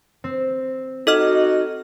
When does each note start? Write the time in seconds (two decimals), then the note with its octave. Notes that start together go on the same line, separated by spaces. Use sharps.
0.24 C4
1.07 D#4 F#4 A4 D#5 F6